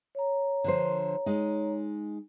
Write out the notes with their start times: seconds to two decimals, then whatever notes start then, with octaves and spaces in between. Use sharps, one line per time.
0.15 C#5 A#5
0.64 D3 F3 C5
1.26 G#3 D#4